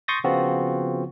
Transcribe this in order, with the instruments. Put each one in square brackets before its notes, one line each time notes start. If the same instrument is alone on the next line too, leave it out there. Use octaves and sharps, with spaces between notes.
[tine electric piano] C6 C#6 D#6 G6 A6 A#6
C#3 F3 B3 C4 F4 F#4